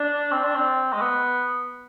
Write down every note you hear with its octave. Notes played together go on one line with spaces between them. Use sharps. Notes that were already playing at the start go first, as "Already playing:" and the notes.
Already playing: D4
C4
D4
C4
G#3
B3